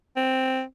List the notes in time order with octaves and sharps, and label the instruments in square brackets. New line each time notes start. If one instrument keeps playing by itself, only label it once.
[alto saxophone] C4